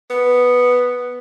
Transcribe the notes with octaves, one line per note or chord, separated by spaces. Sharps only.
B3